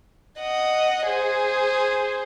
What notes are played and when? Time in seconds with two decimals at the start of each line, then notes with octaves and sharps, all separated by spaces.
0.40 D#5 F#5
1.07 G#4 C5